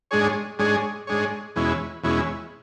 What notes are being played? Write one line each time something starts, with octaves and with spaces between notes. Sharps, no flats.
G#2 G#3 D4 G#4 C#5
G#2 G#3 D4 G#4 C#5
G#2 G#3 D4 G#4 C#5
E2 B2 G#3 C#4 E4
E2 B2 G#3 C#4 E4